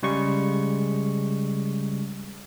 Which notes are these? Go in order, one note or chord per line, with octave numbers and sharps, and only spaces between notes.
C#3 G3 G#3 C#6